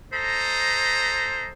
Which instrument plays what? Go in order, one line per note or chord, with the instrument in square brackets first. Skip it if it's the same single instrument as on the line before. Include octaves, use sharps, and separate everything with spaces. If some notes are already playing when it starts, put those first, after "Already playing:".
[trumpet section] A4 D#5 A#5 [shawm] C5